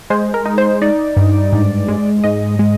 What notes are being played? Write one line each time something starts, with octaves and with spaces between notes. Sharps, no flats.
G#3 C5
A#4
D#4
C5
D#4 D5
G2
G#2
G#3
G#2 D#5
G#3